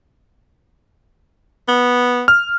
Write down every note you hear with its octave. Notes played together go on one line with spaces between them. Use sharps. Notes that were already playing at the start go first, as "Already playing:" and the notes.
B3
F6